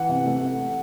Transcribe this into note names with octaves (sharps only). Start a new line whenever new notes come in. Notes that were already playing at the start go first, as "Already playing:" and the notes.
Already playing: E3 F#5
C3
A3